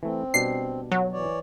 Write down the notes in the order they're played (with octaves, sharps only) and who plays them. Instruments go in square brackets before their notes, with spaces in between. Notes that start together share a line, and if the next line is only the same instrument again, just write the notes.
[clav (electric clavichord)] E3 A3 [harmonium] C4
[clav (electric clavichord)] B2 G3 D4 [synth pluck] C7
[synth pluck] F#3
[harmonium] E3 C#5 D5